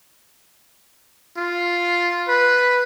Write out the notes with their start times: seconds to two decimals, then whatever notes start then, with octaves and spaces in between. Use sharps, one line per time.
1.37 F4
2.28 B4